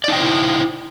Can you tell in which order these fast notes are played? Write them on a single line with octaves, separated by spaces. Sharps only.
D5 D#4 G5 C5 E4